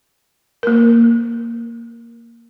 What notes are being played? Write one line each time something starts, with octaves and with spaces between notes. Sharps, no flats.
A#3 A#4